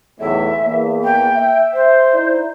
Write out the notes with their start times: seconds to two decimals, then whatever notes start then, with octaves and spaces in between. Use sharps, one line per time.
0.20 B1 E2 A2 E5
0.67 E2 A#3
1.04 G5
1.37 E5
1.73 C5
2.14 D#4 E4 D5